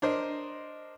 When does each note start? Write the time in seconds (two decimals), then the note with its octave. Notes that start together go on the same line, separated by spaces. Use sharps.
0.02 D4 A#4 C5 D#5